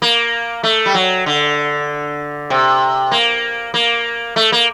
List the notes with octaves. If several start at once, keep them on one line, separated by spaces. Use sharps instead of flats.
A#3
A3
G3
F#3
D3
C3
A#3
A#3
A3
A#3